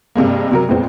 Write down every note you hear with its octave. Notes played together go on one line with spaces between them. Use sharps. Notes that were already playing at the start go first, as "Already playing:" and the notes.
G2 C3 G#3 A#3
C3 F#3 A#4
F2 A#2 G#3 B3 C4